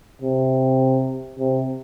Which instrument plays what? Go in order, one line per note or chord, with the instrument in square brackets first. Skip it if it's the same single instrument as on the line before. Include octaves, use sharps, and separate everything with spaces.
[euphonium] C3
C3